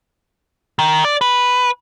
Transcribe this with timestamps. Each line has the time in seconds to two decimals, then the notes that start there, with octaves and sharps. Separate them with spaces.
0.79 D#3
1.05 D5
1.21 B4